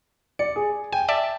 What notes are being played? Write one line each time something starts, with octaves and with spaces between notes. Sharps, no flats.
D5 C#7
G#4
G5 G#5
D5 E5 A5